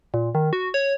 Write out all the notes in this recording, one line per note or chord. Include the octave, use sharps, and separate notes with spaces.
A#2
D#3
F#4
C#5